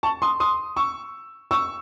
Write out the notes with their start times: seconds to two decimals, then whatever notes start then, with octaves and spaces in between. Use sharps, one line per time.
0.03 A5 C#6
0.22 C6 D#6
0.40 C6 D#6
0.76 C#6 E6
1.51 C#6 E6